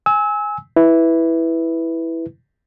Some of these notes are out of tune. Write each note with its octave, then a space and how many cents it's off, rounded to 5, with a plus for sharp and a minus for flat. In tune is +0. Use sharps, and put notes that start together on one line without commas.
G#5 +0 E6 -30
E4 -5 B4 +0